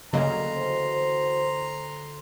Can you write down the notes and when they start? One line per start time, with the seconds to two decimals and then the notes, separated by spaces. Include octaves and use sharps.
0.13 D2 C#3 F#3 A#3 D#5 F5 A#5 C6
0.56 E3 F#4 C5